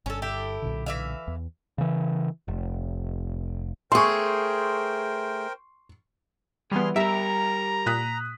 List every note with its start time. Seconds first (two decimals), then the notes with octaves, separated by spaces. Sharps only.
0.06 G1 C#4 A4
0.22 E4 G4 A4
0.62 B1 A#2 D3
0.86 E3 E5 F5
1.28 E2
1.78 C#3 E3
2.48 F1
3.92 A3 G#4 A#4 C5 G5 C6 C#6
6.72 E3 G3 B3 G#4 C6 F6
6.96 G3 G4 A#4 E5 A#5
7.86 A#2 D#6 F#6 B6